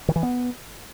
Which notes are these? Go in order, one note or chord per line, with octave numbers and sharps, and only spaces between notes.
D#3
E3
B3